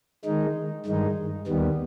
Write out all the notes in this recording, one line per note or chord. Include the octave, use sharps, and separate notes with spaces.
D#3 G#3 D#4
G2 D#3 G#3 D#4
D#2 D#3 G3 B3